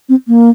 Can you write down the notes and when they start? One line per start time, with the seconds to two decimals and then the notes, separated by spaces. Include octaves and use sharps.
0.09 C4
0.28 A#3